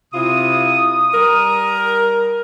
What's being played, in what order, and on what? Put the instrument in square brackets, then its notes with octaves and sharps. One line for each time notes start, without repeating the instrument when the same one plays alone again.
[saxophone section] C3 E4 F4 [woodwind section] D#6
[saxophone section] G3 A#4